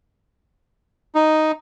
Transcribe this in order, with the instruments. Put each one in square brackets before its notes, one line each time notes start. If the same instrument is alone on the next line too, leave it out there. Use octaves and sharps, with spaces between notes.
[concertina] D#4